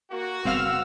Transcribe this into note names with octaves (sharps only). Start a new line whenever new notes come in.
A#3 F#4
F#1 G3 B3 C4 F5 F#5 E6 F6